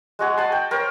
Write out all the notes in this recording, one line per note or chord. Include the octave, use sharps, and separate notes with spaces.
G#3 F#4 G#4
D#5 F#5 A5 C6
G5
A#4 C5 C#5 G5